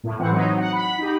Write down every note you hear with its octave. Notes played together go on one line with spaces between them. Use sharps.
A2
E3 C4 F#5
F#3 D#4
F#5
B5
D#4 G4